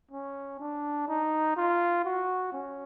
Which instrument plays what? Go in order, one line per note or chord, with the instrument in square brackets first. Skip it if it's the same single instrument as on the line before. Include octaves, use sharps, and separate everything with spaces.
[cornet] C#4
D4
D#4
F4
F#4
C#4